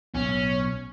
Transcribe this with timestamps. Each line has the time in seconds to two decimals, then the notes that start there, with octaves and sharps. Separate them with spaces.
0.15 B1 A2 C#4